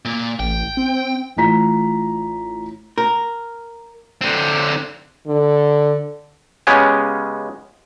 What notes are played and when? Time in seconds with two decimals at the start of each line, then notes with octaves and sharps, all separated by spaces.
0.05 A#2 A#3
0.40 A1 G5
0.77 C4
1.37 A1 A2 F4 A#5 B6
2.98 A#4
4.21 D3 C4
5.27 D3
6.67 C#3 G#3 B3 C#4 G4 G#4